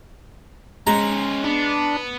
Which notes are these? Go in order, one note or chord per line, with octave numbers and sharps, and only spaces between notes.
G#3 C#4 C5 A#5
B3 D4